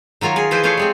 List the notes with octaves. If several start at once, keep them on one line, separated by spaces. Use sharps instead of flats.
D#3 F#3 F4 A#4 C#5
G#4 G#5
E3 F3 E4 G#4 B4 C5
A3 F4 G#4 C5 C#5 F5
G3 G#3 C4